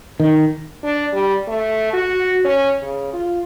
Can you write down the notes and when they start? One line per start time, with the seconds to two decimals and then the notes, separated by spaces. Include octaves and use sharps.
0.20 D#3
0.83 D4
1.13 G3
1.48 A3
1.93 F#4
2.44 C#4
2.82 C#3
3.13 F4